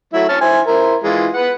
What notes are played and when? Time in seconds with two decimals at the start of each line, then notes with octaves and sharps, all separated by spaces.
0.13 F#3 A3 E4
0.29 C#5 A5 F6
0.41 E4 C5 G#5
0.67 E4 A#4 C5
1.03 E3 G#3 F4
1.34 B4 F#5